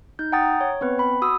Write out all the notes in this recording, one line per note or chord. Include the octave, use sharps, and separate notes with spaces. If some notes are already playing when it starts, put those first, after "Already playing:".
D#4 G6
F#5 G5 A#5 D#6 A6
C#5
B3 C4 B4
B5
F#4 D#6 E6